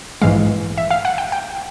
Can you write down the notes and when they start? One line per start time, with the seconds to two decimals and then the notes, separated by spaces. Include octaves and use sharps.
0.22 A#1 G#2 E3 G#3 F5
0.77 E5
0.90 F5
1.05 F#5
1.18 G5
1.32 G5